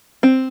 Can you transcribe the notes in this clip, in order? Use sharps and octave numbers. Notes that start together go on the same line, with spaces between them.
C4